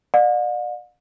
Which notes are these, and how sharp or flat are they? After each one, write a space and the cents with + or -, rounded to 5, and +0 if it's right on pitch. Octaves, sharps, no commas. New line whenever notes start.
D5 +40 F5 +45